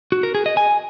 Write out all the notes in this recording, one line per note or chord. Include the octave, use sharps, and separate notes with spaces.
F#4
A#4
G#4
D#5
G#5